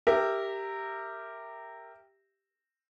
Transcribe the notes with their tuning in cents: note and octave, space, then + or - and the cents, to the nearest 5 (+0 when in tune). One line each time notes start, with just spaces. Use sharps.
G4 +0 A#4 -15 E5 +0